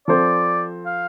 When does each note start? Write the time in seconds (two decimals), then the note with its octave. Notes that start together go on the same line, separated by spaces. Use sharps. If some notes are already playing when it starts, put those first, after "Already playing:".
0.08 F3 C4 A4 C5 D5
0.86 F5